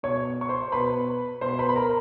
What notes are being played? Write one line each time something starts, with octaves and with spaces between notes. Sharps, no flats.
B2 C#5 C#6
C#6
C5 C6
B2 B4 B5
B2 C5 C6
B4 B5
B5
A#4 A#5